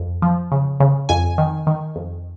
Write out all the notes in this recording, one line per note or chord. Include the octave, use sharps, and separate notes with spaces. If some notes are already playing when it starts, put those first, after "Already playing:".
Already playing: F2
F3
C#3
C#3
F2 G#5
D#3
D#3
F2